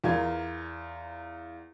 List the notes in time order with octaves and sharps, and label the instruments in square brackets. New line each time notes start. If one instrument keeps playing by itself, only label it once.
[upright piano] E2 F4 A#4 G#6